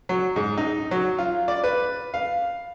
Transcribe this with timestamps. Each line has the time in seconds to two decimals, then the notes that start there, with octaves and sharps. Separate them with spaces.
0.09 F#3
0.36 G#2
0.58 D#4
0.91 F#3
1.19 F4
1.48 D5
1.64 B4
2.14 F5